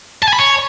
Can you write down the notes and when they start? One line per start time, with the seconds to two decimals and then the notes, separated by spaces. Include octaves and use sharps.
0.22 A5
0.28 G#5
0.33 B5
0.38 C#5